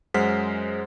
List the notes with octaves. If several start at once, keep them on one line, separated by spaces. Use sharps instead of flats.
F#2 G#3 C5 F#5 F6 B6